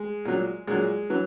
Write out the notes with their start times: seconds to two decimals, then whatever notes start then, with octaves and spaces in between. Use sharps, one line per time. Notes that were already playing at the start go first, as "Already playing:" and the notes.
Already playing: G#3
0.25 A#2 F#3
0.67 A#2 F#3 G#3
1.10 E3 F#3